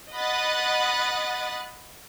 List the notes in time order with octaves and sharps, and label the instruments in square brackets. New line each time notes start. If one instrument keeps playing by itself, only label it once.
[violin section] D#5 F#5 B5 D#6 F#6 A6